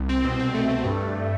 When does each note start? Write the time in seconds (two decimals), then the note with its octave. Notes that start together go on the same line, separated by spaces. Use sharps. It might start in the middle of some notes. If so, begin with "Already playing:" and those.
Already playing: C2
0.09 C4
0.24 B2
0.39 C4
0.54 A3
0.70 A3
0.85 G2
1.00 G2